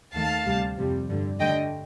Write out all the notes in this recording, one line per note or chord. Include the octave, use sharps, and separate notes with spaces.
D#2 D#3 A3 F5 A5
D2 C3 G3
F2 C3 G3
G2 D3 G3
G2 D3 A3 D#5 G5